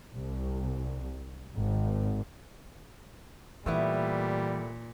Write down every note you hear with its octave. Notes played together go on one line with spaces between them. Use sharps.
C2
G#1
A#2 E3 G3 A3 B3 E4